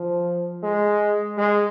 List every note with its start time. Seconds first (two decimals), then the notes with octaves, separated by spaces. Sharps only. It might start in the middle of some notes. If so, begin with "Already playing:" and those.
Already playing: F3
0.63 G#3
1.37 G#3